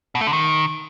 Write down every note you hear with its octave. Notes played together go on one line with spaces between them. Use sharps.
B2
A3
D3
D#3